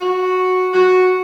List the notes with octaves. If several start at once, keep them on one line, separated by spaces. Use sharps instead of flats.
F#4
F#4